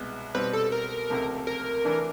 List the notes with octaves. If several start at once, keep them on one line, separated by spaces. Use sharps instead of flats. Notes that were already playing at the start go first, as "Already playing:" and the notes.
Already playing: C2 B2 G#3 B3
B2 G3 C4 B4
A4
A#4
C#2 C3 F3 A3
A#4
E3 A3 D4